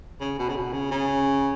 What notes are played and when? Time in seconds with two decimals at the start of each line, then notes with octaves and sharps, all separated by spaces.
0.20 C#3
0.39 B2
0.49 C#3
0.56 B2
0.73 C#3
0.91 C#3